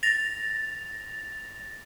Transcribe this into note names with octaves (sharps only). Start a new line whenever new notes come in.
A6 A#6 F7